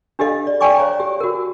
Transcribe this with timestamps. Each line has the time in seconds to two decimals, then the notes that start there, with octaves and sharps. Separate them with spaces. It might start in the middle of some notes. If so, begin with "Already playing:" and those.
0.19 D4 G4 A4 D#5 F5
0.47 D5
0.61 D5 G5 G#5 C#6 D6
0.78 C5 C#5 F5 A#5
1.00 G4
1.20 F#4 A#4